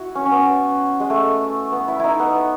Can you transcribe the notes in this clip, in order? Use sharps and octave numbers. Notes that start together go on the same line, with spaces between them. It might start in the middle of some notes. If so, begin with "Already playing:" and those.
Already playing: E4 F#4
C#4
C#4
B3
G#3
A3
B3
E4
D#4 E4
B3